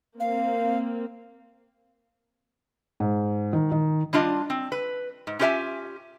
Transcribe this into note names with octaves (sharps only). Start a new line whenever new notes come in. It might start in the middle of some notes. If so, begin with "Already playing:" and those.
A#3 C4 F5
G#2
D#3
D#3
G3 D4 F4 D#5
C4
B4
G#2
C#4 F4 G4 A#4 E5 G#5